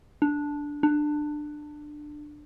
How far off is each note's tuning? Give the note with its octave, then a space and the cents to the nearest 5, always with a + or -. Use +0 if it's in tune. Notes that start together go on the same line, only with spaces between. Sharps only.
D4 -5
D4 +20